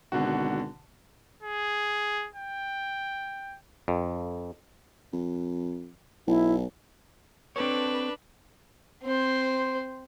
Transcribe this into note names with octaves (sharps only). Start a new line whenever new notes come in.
G#1 B2 D3 F#4
G#4
G5
F2
F2
B1 E4
C4 D4 A4 B4 C#5
C4 C5